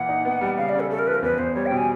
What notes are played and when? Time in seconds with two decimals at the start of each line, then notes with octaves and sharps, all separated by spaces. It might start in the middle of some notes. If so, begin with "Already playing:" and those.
Already playing: A#2 E3 F#5
0.09 D#4
0.25 B3
0.41 G3
0.57 C#3 F5
0.69 D5
0.75 C#3
0.80 A4
0.90 A3 A4
0.99 A#4
1.07 F3 B4
1.14 A#4
1.22 E2 B4
1.38 E2 C5
1.55 G3 C#5
1.66 G5
1.71 B2
1.77 G#5